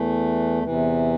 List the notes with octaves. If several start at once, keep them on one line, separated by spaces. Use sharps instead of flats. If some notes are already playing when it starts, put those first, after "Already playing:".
Already playing: E2 E3 A3
E2 C3 E3